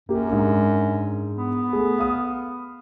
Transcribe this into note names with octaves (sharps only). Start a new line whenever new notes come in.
F#2 A#3 G4
G#2 D4
B3
A3 G#4
F5 D#6